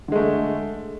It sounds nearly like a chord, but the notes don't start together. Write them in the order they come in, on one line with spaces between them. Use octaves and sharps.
D3 G#3 A3